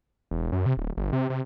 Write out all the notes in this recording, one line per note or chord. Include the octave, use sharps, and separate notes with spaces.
E1
F#2
C3
D1
G1
C3
C3